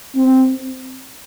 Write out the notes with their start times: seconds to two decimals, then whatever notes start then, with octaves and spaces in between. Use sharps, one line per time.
0.15 C4